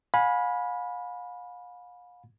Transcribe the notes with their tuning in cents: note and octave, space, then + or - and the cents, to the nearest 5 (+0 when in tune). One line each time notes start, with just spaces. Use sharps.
F5 +40 G#5 +0 B5 -10